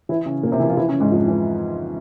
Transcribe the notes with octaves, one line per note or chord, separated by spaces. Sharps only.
E3 E4
C#3 C#4
A#2 A#3
C3 C4
E3 E4
F3 F4
E3 E4
C#3 C#4
G#2 G#3
F2 F3
E3